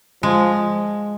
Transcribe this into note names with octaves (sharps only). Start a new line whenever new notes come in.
F3 G#3